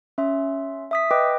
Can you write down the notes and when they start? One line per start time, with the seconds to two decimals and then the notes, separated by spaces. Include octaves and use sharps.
0.18 C#4 E5 C6
0.91 E5 D#6 B6
1.11 B4 D#5 G5 D6